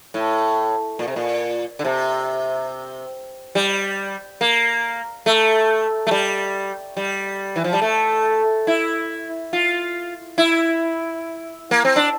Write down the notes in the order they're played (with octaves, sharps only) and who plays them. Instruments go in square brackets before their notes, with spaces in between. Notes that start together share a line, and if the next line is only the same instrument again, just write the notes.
[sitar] A2
A#2
C3
A#2
D3
C3
G3
A#3
A3
A3
G3
G3
E3
F3
G3
A3
E4
F4
E4
A#3
C4
D4